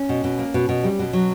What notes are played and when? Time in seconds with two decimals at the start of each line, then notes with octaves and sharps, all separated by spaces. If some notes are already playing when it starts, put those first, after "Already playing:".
Already playing: C#4
0.09 B2
0.24 B2
0.39 A#3
0.54 B2
0.69 B2
0.84 G3
0.99 B2
1.13 F#3